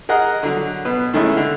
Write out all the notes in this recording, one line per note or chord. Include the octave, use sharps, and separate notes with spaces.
G#4 A#4 D#5 F#5 A#5
D3 F#3
B2 B4
D#3 G#3 A3 C#4 E4
D3